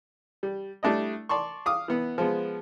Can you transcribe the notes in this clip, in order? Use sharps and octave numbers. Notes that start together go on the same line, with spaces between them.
G3
G3 A3 D4 E4 D#5
D5 A5 C6 C#6
F5 D6 D#6
E3 B3
F3 G#3 B3